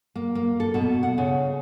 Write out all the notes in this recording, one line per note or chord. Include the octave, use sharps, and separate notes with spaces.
A#3
A#3
A4
B2
F#5
C#3